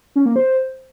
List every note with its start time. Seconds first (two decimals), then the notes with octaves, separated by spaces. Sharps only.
0.16 C#4
0.26 A#3
0.36 C5